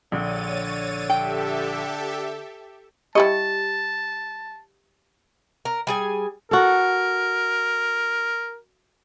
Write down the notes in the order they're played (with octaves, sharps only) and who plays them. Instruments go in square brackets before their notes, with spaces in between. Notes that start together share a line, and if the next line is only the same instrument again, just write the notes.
[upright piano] A#1 [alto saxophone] D3 [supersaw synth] C#5 A6 D#7
[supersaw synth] G4 A4 E5 [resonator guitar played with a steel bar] G5
[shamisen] G3 E4 D#5 [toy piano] G4 [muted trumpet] A5
[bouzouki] A#4
G3 G#4 G#5
[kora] F#4 A4 [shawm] A#4